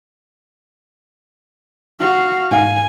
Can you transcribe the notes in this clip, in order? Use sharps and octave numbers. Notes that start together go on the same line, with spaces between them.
F#4 F5
G#2 F5 G#5